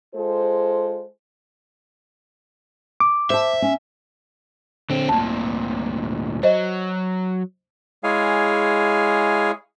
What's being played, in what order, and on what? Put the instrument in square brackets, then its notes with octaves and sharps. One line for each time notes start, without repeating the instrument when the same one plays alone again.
[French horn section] G#3 F4 A4 C5
[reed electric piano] D6
[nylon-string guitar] C5 A5 [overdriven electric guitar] E5
[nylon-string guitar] C#4
[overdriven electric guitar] D3 C4
[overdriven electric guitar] D2 A#2 [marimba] A5
[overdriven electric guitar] F#3 [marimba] C5 D#5
[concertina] G#3 E4 G#4 C#5 F5 G#5